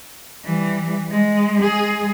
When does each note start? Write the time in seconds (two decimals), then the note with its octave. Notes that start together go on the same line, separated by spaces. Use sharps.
0.44 E3 G3
1.11 G#3
1.61 G#3 G#4